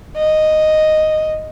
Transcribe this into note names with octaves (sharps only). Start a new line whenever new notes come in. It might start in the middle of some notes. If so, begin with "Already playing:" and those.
D#5